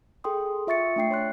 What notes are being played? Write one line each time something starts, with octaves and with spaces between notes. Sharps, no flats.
G#4 A4 G5 C6 D#6
F4 E5 C#6 A6 C#7
A3 D4 G5 C7
C#5 C6 F#6